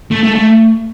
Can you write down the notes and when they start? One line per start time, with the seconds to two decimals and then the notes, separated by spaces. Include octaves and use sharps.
0.11 A3
0.23 A3
0.35 A3